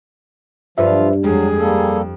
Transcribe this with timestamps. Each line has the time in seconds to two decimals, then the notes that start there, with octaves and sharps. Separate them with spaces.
0.78 G2 F3 F4 B4 C5 E5
1.24 F2 F#3 G#3 G#4
1.57 G3 A#3 A4